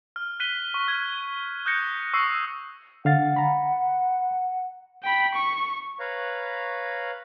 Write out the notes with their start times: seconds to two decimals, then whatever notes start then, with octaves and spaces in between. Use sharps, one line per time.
0.16 F6
0.40 F#6 B6 D#7 G7
0.74 C#6
0.88 F6 G#6
1.66 D#6 F#6 G6 A#6 C#7
2.14 C#6 D#6 E6 C7
3.05 D3 F5 F#5 A6
3.36 A#5 B5
5.03 G5 B5
5.35 C#6
6.00 B4 C#5 F5 A#5